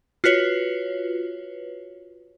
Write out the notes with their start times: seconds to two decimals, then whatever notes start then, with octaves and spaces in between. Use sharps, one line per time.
0.24 F4 F#4 B4 C#5